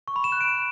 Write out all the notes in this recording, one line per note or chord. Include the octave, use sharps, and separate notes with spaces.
C#6
B5
E7
F#6
D7